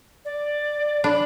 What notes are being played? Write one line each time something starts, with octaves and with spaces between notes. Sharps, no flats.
D5
D4 B5